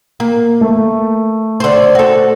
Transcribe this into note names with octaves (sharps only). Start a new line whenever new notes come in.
A#3
A3
D3 C5
F#4 A4